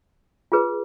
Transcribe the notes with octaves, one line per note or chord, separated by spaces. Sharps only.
F4 G#4 B4